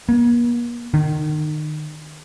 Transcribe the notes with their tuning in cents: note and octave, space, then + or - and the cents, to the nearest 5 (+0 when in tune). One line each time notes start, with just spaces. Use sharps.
A#3 +45
D#3 -30